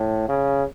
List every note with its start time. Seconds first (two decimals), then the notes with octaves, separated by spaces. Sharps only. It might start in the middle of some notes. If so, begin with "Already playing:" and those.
Already playing: A2
0.29 C#3